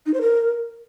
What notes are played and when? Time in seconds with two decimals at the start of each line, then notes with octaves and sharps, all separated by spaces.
0.06 D#4
0.14 C5
0.21 A#4